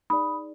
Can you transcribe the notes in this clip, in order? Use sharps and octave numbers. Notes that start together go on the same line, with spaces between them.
D#4 G#4 D5 B5 D#6